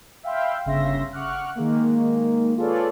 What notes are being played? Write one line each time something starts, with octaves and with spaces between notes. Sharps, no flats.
E5 F5 G5 B5 C6
G1 C#3 E5 C6 A#6
F#5 C#6 D6 F6 F#6
D#3 G#3 A#3
F4 G#4 A4 B4 C#5 D5